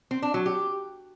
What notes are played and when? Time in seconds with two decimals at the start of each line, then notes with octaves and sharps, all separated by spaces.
0.11 C4
0.22 D4
0.34 F#3
0.46 G4